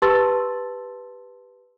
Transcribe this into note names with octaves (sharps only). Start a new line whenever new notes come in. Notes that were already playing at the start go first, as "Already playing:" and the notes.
G4 B4 A5 C6 E6 A6